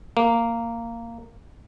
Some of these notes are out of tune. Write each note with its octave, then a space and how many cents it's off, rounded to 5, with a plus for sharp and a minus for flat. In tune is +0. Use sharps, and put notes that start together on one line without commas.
A#3 -10